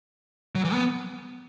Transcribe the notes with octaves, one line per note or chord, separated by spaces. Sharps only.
F#3
E3
B3